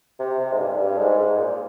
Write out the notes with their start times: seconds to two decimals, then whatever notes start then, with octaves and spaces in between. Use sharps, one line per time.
0.19 C3
0.39 C3
0.53 G#2
0.59 G2
0.74 G#2
0.78 G2
0.98 G#2
1.19 G#2
1.38 A#2